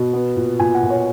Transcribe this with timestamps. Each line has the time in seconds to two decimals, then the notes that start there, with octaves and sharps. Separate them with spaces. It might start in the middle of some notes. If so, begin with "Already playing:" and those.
Already playing: B2
0.13 B3
0.36 A#2
0.60 A#2 G#5
0.75 F#5
0.83 A#2
0.90 C#5